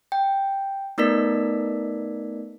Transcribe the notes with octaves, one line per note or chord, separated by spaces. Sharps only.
G5
A3 B3 D#4 A#4 D5 B6